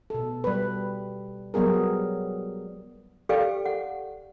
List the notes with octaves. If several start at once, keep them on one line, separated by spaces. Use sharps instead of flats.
B2 A4
G3 B4
F#3 G3 B3 G#4 A#4
G4 A4 B4 D5 F5 G5
F#5